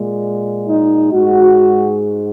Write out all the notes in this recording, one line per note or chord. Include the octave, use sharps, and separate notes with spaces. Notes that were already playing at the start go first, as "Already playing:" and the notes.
Already playing: A#2 G#3
D#4
G#2 G#3 F#4